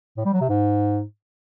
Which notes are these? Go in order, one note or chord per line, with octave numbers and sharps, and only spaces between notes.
A2
G3
F#3
C3
G#2